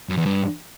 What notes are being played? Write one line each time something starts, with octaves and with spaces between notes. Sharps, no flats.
F#2
E2
G2